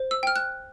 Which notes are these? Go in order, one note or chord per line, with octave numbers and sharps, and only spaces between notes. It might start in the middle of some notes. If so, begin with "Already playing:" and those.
Already playing: C5
E6
G5 F6
F#6